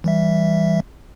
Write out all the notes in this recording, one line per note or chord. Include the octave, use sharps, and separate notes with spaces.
E3 G3 E5